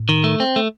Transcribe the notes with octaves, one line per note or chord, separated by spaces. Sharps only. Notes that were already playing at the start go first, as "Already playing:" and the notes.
Already playing: A2
D#3
A3
C4
A3